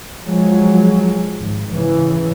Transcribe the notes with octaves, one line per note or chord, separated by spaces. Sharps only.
F3 F#3 G#3
G#1
C#3 E3